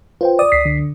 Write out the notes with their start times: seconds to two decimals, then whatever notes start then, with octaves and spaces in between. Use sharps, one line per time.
0.21 F4 B4 C5 G5
0.39 D5 D#6
0.52 C#2 B6 C7
0.65 D3